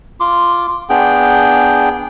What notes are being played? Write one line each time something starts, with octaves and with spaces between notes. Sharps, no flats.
F4 C6 D6
B3 D4 G#4 G5